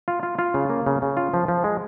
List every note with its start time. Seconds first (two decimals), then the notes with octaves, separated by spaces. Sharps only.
0.08 F4
0.23 F4
0.39 F4
0.54 C#3
0.70 A#3
0.86 C#3
1.02 C#3
1.17 F4
1.34 F3
1.48 F3
1.64 G#3